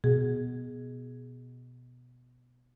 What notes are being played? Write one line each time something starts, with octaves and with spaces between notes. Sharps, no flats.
B2 G#4